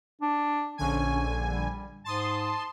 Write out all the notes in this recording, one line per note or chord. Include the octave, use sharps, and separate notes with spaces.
D4
A#1 D3 C#4 G#5
G3
G#2 A5 C6 D#6